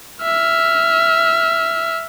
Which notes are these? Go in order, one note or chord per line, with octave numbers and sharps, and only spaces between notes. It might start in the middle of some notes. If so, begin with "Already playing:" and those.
E5 F6